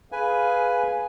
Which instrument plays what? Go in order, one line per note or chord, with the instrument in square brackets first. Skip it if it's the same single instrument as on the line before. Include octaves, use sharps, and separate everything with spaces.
[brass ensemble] G#4 F5 [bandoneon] B4 G#5